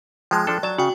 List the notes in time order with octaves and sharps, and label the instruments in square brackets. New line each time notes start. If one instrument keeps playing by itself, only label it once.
[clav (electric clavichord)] F3 G#3 [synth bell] G5 A5 F#6
[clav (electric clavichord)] F3 D4 A4
[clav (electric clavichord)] F#3 A5 [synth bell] D5
[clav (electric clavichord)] C#3 [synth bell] F#4 G5